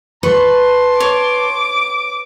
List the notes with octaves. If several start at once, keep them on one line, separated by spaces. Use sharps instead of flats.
B4 A5 C6 C#6
C#5 D6